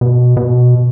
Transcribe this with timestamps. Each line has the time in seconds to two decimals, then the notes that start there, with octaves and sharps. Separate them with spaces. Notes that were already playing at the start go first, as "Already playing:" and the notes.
0.01 B2
0.37 B2